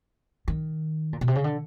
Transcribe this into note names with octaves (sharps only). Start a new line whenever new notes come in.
D#3
A#2
B2
C3
C#3
D3